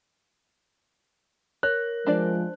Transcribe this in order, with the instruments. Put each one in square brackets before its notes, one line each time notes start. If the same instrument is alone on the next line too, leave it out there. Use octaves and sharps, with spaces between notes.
[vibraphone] A#4 [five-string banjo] C#5 [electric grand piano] F#6
[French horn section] F3 G#3 [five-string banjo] D4 C5 D5